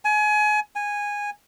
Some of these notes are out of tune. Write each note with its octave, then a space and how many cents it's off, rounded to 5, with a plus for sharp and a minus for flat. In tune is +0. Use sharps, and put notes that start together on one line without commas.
G#5 +30
G#5 -10